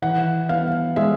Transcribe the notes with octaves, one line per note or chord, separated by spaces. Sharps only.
E3 F#5
B3 F5
G#3 E5